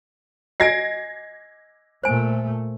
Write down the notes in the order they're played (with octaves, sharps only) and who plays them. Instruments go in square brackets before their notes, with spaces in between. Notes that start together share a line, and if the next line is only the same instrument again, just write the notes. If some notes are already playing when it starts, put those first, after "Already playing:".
[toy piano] D#5 G#5 [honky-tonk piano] G#6 A#6 C7
[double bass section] A#2 A3 [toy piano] C5 G#5